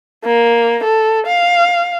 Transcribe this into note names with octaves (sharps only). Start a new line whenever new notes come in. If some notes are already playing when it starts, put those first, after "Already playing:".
A#3
A4
F5